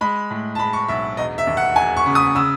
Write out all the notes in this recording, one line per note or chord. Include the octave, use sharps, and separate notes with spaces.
G#3 B5
A2
A5
G#3 B5
C#6
B1 E5
E1 D#5
E5
D#2
F#5
E1 G#5
C#6
C#3
D#6
C#3 E6